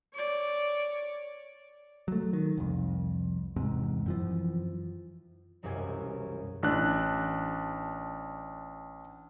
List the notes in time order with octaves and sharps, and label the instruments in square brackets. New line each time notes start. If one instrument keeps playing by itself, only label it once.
[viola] C#5 D5
[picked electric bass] F#3 A3
D#3
C2 F2
E2 G#2 C3
F#2 E3 F3
[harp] E1 C2 F#2 G4 G#5 G#6
[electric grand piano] A1 D4 F#6